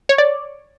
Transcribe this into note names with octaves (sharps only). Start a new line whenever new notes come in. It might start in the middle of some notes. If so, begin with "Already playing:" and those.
C#5
D5